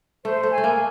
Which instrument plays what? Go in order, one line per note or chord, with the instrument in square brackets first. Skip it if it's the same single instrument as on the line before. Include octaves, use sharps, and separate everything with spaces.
[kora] A3 [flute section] C5
[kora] A3
[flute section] G#5
[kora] A3
A#3